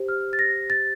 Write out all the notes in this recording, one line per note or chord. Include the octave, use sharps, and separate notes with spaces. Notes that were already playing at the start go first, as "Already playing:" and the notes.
Already playing: G4 C5
F6
A6
A#6
A6